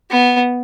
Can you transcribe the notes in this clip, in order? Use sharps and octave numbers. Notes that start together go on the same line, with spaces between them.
B3